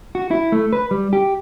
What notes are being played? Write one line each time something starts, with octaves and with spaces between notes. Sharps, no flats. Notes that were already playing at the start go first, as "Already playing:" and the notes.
F#4
E4
A3
B4
G3
G4